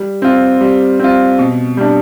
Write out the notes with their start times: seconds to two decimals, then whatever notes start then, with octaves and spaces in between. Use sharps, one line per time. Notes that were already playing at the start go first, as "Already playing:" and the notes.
Already playing: G3
0.22 C4 F4
0.61 G3
1.00 C4 F4
1.39 B2
1.77 G3 D4